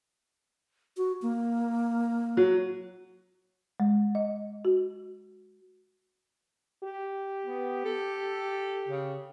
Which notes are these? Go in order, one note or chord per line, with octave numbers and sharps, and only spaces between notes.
F#4
A#3
F#3
G#3
D#5
F#4
G4
B3
A4
C#3